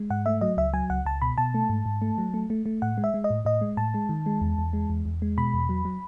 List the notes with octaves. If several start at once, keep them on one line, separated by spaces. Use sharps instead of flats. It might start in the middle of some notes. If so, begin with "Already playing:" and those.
Already playing: G#3
G#2 F#5
A3 E5
F#3 D#5
C#2 E5
F#3 G#5
C#2 F#5
C#2 A5
B2 B5
B2 A5
A3
G#2
G#2
A3
F#3
A3
A3
A3
A2 F#5
G#3
E5
G#3
D#5
A2
A2 D#5
G#3
A2 A5
G#3
D#3
G#3
E2
E2
G#3
E2
E2
G#3
B2 B5
E2
F#3
F#3